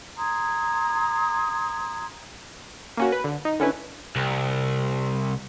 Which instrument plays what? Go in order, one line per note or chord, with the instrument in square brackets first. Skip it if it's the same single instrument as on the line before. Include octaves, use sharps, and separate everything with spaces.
[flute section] A#5 C6 D#6 G#6
[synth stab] A#3 C#4 F#4
B4
D3
D#4
D3 C#4 E4 B4
[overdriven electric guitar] C2